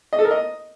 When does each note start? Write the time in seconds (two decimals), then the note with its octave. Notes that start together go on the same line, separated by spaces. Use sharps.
0.13 D#5
0.19 A4
0.25 A#4
0.31 D#5